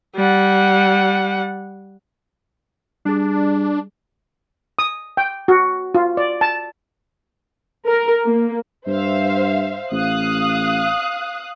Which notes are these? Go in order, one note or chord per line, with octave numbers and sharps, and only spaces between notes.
G3 F#5
G3 D4 G#4
D#6
G5
F#4
F4
D5
A5
A#4
A#3
G2 C5 E5 F5
A1 F5 D#6 F#6